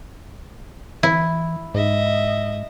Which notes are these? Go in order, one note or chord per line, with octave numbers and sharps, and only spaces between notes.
E3 E4
G#2 D#5 E5